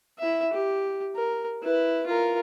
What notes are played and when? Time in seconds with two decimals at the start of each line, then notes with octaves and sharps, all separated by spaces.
0.19 E4 E5
0.53 G4
1.16 A#4
1.62 E4 B4
2.06 F4 A#4